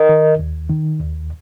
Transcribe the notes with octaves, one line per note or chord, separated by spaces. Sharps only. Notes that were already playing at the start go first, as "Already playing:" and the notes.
Already playing: A#4 D#5
D#3
D#2
D#3
D#2